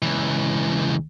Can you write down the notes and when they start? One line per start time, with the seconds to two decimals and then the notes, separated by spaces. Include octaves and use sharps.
0.02 C#2 E3